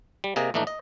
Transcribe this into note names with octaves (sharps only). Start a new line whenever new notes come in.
G3
C3 A#3 G#4 D#5
A#1 E3 A3 D4 D#4
D#5